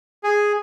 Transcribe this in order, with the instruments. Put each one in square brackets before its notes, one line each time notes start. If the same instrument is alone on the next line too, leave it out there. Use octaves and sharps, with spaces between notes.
[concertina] G#4